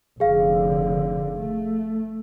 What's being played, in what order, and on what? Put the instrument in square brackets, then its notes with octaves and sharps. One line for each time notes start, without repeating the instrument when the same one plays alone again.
[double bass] F1 D3 [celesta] G#4 F5
[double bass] A3